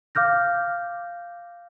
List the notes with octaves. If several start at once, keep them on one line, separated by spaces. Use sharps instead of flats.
F5 D6 F6 G6 A#6